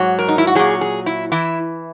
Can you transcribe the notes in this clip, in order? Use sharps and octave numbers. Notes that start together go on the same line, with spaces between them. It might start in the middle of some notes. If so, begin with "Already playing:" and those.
Already playing: G#2 F#3
A#4
D#4
E4
F#4
A#2 F#3 G#4
G#4
E4
E3 E4